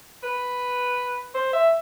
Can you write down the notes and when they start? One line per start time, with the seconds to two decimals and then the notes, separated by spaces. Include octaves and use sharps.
0.23 B4
1.34 C5
1.53 E5